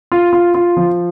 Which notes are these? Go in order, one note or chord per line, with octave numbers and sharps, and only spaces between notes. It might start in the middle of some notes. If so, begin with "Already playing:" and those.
F4
F4
F4
F3